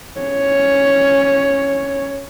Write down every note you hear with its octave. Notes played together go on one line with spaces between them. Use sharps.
C#4 C#5